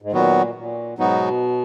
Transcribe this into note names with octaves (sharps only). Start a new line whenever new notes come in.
G#2
A#2 D#3 F#3 B3 F#4
A#2
G#2 B2 F#3 B3 D#4 F#4